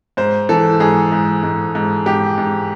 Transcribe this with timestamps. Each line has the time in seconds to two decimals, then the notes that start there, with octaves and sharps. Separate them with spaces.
0.17 G#2 C5
0.49 E3 A4
0.80 G#2 G#4
1.12 G#2
1.43 G#2
1.75 G#2
2.06 G#2 G4
2.38 G#2